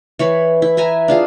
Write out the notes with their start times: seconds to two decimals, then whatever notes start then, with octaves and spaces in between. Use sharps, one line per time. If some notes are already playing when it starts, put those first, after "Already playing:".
0.19 E3 C#5 B5
0.62 E4
0.77 B4 E5 G#5 A#5
1.08 D4 F4 G#4